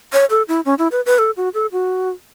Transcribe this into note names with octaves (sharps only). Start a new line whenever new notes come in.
C#5
A4
E4
C#4
E4
B4
B4
A4
F#4
A4
F#4